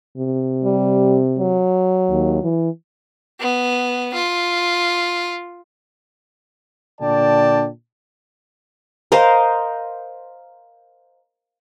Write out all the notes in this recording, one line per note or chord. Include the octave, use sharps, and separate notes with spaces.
C3
G3
F#3
D#2
E3
B3
F4
A#2 D3 D4 D5 G5 A5
A#4 C5 D#5 F5